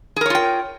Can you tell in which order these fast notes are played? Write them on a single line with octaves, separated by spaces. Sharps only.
G#4 A#4 C#5 F4 G5